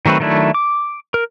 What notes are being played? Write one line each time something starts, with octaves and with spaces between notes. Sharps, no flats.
D#3 F#3 A3 C4 B4
D#3 F#3 A3 D4 E4
D6
A#4